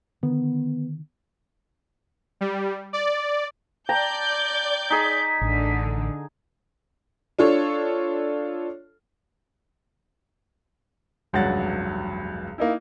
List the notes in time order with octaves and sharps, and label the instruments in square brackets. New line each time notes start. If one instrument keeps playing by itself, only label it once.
[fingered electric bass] D3 D#3 [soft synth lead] B3
[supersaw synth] G3
D5
[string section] D5 G6 [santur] G5 A5 A#5
[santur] D#4 G#4 [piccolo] B6
[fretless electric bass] A1 [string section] D3
[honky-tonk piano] D4 F4 A4 C#5
[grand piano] F1 C#2 G2 F#3 F#5 A6
A#3 D#4 E4